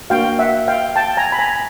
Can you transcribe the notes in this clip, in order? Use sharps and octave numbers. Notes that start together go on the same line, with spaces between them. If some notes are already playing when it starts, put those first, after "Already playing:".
A#3 D4 F#4 F5 G5
E5 F#5
F5 G5
G5 A5
G#5 A#5
B5
G#5 A#5